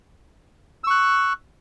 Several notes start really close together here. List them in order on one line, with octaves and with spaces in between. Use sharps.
E6 C#6 F#6